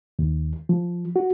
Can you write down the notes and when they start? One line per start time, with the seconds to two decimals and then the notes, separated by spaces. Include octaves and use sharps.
0.19 D#2
0.69 F3
1.16 F#4